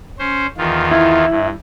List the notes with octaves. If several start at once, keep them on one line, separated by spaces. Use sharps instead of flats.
C#4 C5
E2 D#3 F4
E4
G2